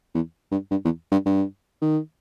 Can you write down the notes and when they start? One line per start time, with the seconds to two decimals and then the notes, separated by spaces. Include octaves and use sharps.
0.15 E2
0.51 G2
0.71 G2
0.85 E2
1.12 G2
1.26 G2
1.81 D#3